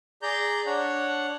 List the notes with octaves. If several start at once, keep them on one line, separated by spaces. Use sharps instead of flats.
G#4 D5 A#5 G6
D4 C#5 F#5